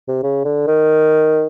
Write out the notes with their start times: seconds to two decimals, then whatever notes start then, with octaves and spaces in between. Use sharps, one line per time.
0.08 C3
0.23 C#3
0.45 D3
0.67 D#3